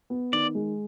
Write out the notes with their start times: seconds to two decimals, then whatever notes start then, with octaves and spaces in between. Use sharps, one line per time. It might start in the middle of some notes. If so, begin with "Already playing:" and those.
0.10 B3
0.32 D#3 D5
0.55 G#3